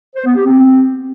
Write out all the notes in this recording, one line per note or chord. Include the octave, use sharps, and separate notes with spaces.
C5
B3
G4
C4